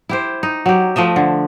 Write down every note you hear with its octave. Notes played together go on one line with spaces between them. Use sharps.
E4 G4 C5
D#4
F#3 G4
F3 A3 D#5 E5
D3